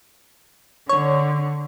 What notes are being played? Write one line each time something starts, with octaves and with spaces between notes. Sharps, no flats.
D3 C#5